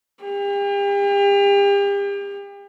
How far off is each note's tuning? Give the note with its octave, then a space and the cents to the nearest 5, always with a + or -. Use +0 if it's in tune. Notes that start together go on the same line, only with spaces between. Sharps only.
G4 +40